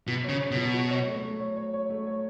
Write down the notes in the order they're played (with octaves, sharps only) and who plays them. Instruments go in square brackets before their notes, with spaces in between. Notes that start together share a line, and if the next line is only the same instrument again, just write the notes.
[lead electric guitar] B2 [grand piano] F#3
[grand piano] C#5
[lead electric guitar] C#3
[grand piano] C#5
[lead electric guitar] B2
[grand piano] F#3
F#4
C#5
A3
A3
C#5
C#5
C#5
A3
C#5